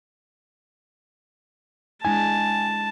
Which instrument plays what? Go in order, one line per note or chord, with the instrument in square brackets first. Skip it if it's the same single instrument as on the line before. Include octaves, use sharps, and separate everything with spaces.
[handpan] G#3 D4 E4 [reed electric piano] G#5 [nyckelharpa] A5